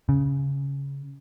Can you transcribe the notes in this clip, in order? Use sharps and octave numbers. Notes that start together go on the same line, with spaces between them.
C#3